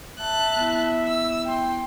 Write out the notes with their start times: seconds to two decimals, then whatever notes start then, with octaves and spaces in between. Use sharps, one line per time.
0.19 E5 A5 F#6
0.56 B3 E4
1.08 E6
1.44 G5 C6